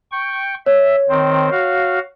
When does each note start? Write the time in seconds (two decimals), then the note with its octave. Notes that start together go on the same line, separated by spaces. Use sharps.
0.12 G5 C#6
0.66 C#5 E5
1.09 D#3 C4 C5
1.51 F#4 F5